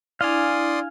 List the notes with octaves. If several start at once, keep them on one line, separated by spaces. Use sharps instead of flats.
D4 E4 D5 F5 G#5 C6 D#6